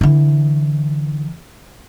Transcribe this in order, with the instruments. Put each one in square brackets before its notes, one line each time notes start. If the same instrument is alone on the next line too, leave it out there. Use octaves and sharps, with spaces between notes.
[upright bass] D3 E3